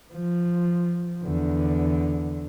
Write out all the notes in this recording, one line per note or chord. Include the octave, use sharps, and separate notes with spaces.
F3
E2 D3